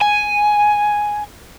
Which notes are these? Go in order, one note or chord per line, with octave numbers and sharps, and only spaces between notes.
G#5